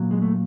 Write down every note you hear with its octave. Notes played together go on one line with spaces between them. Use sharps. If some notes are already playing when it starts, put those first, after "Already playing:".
Already playing: A#2 F#3
G#3
A3